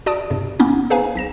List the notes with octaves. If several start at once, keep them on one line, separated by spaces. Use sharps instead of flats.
F#4 D5 A5 D#6 D7
E2 G2 C3
A#3 B3 C#4 D#4
G#4 B4 C5 F5 G#5 A#5
B1 A#6 E7